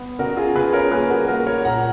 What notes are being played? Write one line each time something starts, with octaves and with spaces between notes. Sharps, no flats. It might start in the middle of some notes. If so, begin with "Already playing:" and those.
Already playing: B3
C#3 F#4 A#4
F4 G#4
C#3 G#4 B4
A#4 C#5
A#3 G#4 B4
F#4 A#4
A#3 F#4 A#4
A#4 C#5
A#2 F#5 A#5